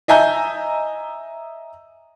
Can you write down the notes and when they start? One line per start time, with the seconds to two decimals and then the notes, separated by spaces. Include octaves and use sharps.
0.08 D#5 E5 G#5 A#5 G6